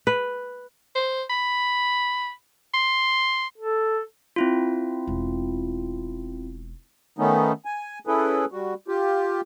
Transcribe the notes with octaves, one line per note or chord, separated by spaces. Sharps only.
B4
C5
B5
C6
A4
C4 E4 F4
E1
D#3 A3 B3 C#4 D#4
G#5
C#4 E4 G#4 A4 B4
G3 F#4
F4 G4